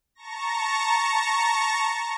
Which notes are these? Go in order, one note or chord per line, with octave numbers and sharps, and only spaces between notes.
A5 A#5 C#6 A#6